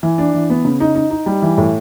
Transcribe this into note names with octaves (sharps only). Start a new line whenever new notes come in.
E3
D4
E3
B3
C#3
D#4
D#4
D#4
G3
E3
A2